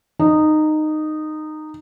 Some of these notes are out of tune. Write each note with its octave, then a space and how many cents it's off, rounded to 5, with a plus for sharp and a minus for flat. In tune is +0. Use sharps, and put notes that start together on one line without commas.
D#4 -15